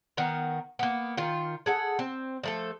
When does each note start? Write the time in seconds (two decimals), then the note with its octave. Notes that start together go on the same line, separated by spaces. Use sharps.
0.17 D#3 B3 A#4
0.79 A#3 B3
1.17 D#3 F4
1.66 G#4 A4 F#5
1.99 C4
2.44 F3 A3 A4